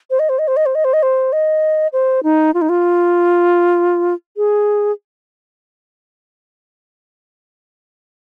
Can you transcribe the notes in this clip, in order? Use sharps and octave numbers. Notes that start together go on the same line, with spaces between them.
C5
D#5
C5
D#5
C5
D#5
C5
D#5
C5
D#5
C5
D#5
C5
D#4
F4
D#4
F4
G#4